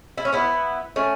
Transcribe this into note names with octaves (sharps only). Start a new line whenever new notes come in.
E4
C#4
B3 E4
A3 C#4